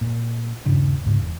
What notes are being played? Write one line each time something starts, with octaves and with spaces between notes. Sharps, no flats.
A#2
D#1 G2 C#3 D4
C#2 G#2 C#3
E1